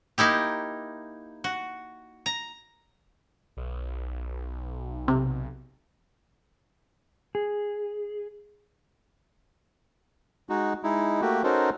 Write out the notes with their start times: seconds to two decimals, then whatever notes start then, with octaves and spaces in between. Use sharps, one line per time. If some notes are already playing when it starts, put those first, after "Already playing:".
0.18 A#3 D#4 E4 G4
1.44 F#4
2.26 A#5
3.57 B1
5.08 C3
7.35 G#4
10.49 G#3 D#4 F#4
10.83 G#3 D#4 E4
11.21 A3 A#3 F#4 G4
11.44 C#4 D#4 F#4 A4 A#4 C5